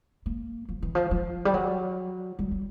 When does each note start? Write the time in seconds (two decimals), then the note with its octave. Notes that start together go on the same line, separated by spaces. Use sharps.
0.26 A#3
0.69 F3
0.83 E3
0.95 F3
1.11 F3
1.45 G3
1.54 F#3
2.39 G3
2.51 G3